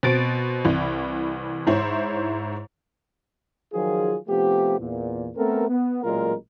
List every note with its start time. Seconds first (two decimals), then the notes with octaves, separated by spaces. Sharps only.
0.03 B2 C4 A6 D7
0.65 C2 E3
1.67 G#2 E4 C5 C#5
3.73 D#3 F3 F#3 F4 G#4
4.28 C3 F3 A3 B3 G4
4.80 E2 A#2
5.36 A3 B3 C4 A4 A#4
5.69 B3
6.04 A1 A#2 F#3 G#3 F4 A#4